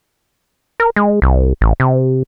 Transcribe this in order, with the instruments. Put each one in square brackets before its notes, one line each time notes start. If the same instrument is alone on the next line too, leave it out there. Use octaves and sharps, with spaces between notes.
[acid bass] A#4
G#3
C2
A1
C3